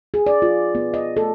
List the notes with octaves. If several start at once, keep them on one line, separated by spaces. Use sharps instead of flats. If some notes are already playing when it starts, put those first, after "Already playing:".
G#4
D5
F4
B3
D#5
A4